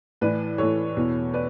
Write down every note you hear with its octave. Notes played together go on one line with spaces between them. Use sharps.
A2 E3 B4 D5
A2 E3 A4 C#5
E2 B2
B4 D5